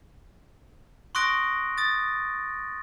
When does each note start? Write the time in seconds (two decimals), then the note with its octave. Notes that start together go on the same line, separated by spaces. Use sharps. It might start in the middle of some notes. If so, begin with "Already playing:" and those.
1.15 C6 C#6 D#6 F#6 A#6 D7
1.78 D#6 A6